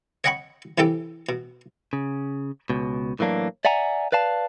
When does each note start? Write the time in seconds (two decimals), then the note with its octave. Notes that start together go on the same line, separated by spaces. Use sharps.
0.24 C#5 D#5 F#5 G5 B5 C#6
0.78 C3 E3 G4 A4 G5
1.29 B2
1.93 C#3
2.70 C#2 B2
3.19 A2 E3 F#3 A#3 D4
3.65 D5 E5 F#5 G#5 A#5
4.12 B4 D5 F5 A5